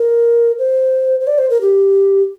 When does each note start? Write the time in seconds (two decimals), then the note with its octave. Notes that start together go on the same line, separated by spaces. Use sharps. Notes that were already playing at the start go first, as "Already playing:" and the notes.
Already playing: A#4
0.59 C5
1.20 C5
1.27 D5
1.38 C5
1.50 A#4
1.61 G4